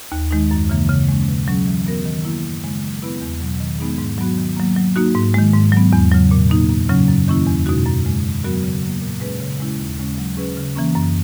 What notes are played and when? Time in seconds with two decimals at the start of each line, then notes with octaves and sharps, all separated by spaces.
0.12 D#2
0.31 D#3 G#3 D#4
0.51 F#2
0.70 C#3 E3 A#3
0.89 C#3
1.09 G#3 C#4
1.28 B2
1.48 F#3 C#4 G#4
1.67 E3
1.86 B3 F#4 A#4
2.05 D#3
2.25 A#3 E4
2.45 F#2
2.64 C#3 G#3
2.83 F#3
3.02 B3 E4 B4
3.21 E2
3.41 B2 F#3
3.60 D#3
3.79 G#3 B3 D#4 G#4
3.98 G#2
4.18 F#3 B3 F#4
4.38 D#3
4.57 F#3 A#3
4.76 F#3
4.96 A#3 D#4 F#4
5.14 G#2
5.34 D#3 G#3
5.53 G#2
5.72 F#3 B3
5.93 E2
6.12 C#3 F#3
6.31 A#2
6.50 A#3 D#4
6.69 F#2
6.89 C#3 F#3 C#4
7.08 F#2
7.28 D#3 A#3 C#4 E4
7.47 E2
7.66 B2 G#3 D#4 F#4
7.86 F#2
8.04 C#3 G#3
8.25 D#3
8.43 F#3 B3 F#4 A#4
8.63 C#3
8.82 F#3 A#3
9.02 A#2
9.20 G#3 C#4 G#4 B4
9.40 C#3
9.60 G#3 C#4 E4
9.79 D#2
9.99 C#3 G#3 C#4
10.18 F#3
10.37 C#4 G#4 B4
10.57 C#3
10.76 E3 A#3 C#4
10.95 F#2